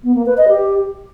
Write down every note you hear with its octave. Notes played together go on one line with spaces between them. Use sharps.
B3
A#3
B4
D#5
G4